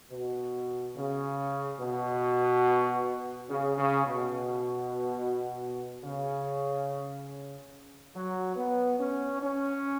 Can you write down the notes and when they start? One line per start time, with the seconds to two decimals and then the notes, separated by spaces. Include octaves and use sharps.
0.11 B2
0.96 C#3
1.79 B2
3.49 C#3
3.77 C#3
4.06 B2
6.04 C#3
8.15 F#3
8.56 B3
8.99 C#4
9.41 C#4